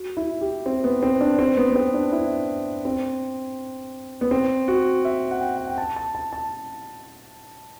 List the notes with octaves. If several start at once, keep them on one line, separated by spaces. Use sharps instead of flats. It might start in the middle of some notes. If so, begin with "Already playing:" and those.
Already playing: F#4
E4
G4
C4
B3
C4
D4
C4
B3
B3
C4
D4
E4
C4
B3
C4
F#4
E5
F#5
G5
F#5
G5
A5
A5
A5
A5